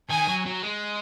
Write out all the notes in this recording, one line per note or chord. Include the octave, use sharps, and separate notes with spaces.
D#3 G#5
F#3
F#3
G#3